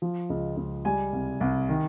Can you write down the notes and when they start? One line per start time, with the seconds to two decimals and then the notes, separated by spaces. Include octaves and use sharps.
0.02 F3
0.30 C#2
0.57 C#2
0.85 G3 G#5
1.13 C2
1.41 C2
1.69 D#3